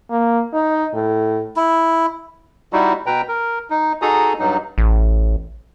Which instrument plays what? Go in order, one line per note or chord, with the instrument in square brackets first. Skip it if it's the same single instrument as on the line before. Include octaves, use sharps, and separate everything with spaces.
[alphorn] A#3
D#4
A2
[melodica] E4
[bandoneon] G3 D#4 E4 F#4
B2 B4 G5 A#5
A#4
D#4
D#4 F#4 G#4 A4 A#5 D#6
G2 F#3 D#4
[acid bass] A1